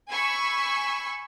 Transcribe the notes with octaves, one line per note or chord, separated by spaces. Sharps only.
G#5 B5 C#6 E6